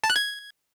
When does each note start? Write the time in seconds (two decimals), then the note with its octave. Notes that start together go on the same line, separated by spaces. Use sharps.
0.04 A5
0.10 F#6
0.16 G#6